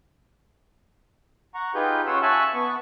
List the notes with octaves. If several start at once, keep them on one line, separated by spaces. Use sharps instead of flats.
F#5 A#5 C#6
D#4 F4 G4 G#4 B4 G6
C#4 F4 C#5 F#5 C6 E6
E5 G#5 A5 C#6 E6 F#6
B3 C#6